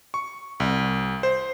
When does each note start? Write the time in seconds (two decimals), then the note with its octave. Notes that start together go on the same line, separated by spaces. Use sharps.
0.14 C#6
0.60 C2
1.23 C5